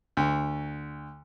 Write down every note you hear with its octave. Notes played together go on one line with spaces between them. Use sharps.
D2